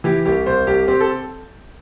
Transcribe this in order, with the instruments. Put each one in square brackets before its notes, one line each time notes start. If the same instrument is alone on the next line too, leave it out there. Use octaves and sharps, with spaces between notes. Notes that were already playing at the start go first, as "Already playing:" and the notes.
[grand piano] E3 G4
C2 G4
C2 C5
C2 G4
C4 G4
A4